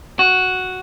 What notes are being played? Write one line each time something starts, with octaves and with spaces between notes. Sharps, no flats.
F#4